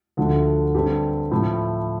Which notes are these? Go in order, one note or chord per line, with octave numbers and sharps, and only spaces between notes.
D2 D3 F3 A3
G2 D3 G3 C4 G4
A2 F3 A3 C4 E4